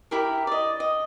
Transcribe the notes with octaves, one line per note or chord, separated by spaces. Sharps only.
E4 G4 A#4
D5 D#5
D#5